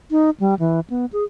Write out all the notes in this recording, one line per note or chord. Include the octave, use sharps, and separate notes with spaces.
D#4
G3
E3
B3
G#4